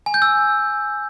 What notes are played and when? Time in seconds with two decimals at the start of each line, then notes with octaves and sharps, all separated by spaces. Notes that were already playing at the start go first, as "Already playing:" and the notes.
0.06 G#5
0.14 G6
0.22 E6